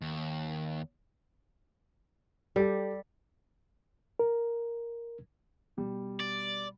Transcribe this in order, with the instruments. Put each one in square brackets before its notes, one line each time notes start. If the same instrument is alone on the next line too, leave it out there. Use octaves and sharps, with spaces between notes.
[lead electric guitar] D#2
[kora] G3 [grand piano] G4 A4
[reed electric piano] A#4
[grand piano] B2 G3
[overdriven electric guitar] D5